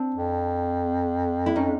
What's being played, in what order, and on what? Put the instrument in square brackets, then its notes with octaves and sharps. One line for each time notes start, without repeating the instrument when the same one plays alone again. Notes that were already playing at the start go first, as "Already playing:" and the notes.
Already playing: [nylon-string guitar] C4 D4
[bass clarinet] F2
[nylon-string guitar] E4
C#4 D#4